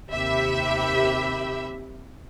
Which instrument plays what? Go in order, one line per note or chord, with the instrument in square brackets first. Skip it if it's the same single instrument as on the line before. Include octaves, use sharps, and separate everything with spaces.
[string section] D#2 C3 G4 E5 B5